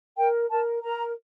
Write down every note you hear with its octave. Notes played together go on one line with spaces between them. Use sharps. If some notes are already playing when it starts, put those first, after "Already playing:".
A#4 G5
A#4 A5
A#4 A#5